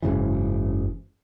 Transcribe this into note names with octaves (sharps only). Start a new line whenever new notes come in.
F#1 G#2 C#3 E3